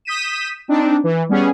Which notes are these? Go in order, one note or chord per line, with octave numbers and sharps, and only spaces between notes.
D#6 G6 B6 D#7 E7
C4 D4 D#4
E3
G3 B3 C#4 G#4